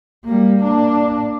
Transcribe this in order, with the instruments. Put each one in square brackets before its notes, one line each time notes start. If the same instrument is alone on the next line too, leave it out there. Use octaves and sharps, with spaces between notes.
[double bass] G3 A#3
A#3 D4